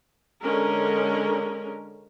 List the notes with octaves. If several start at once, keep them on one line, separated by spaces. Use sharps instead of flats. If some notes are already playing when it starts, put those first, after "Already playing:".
D3 G#3 C#4 A#4